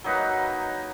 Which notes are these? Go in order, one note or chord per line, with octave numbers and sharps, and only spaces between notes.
F#3 A#3 D#4 B4